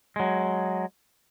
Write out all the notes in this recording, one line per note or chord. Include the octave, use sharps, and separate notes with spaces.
F#3 G#3